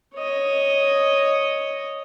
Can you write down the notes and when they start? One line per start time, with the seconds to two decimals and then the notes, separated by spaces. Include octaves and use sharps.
0.16 C#5 D#5